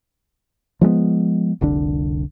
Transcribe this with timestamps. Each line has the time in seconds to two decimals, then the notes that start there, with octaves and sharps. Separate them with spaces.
0.81 F3 G#3 A3 B3
1.61 F1 C2 D3 D4